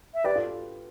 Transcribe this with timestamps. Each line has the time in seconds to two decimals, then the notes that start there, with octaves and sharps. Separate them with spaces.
0.14 E5
0.24 G4 B4 D5
0.35 F4 A4